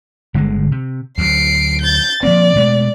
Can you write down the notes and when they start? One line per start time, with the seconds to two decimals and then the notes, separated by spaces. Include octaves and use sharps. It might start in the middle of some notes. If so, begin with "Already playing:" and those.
0.34 G1 D3 G#3
0.72 C3
1.18 D2 F#3 C7 D7
1.81 G6 A6
2.23 F3 A#3 C4 D5
2.56 B2 G#3 A3